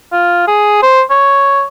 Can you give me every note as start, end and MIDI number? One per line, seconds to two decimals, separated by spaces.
0.13 0.47 65
0.48 0.83 68
0.83 1.01 72
1.10 1.64 73